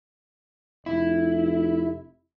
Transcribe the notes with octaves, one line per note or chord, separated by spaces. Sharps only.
F1 E4